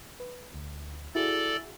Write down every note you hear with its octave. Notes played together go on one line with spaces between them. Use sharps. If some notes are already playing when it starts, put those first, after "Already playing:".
B4
D2
E4 F#4 G#4 A4 D5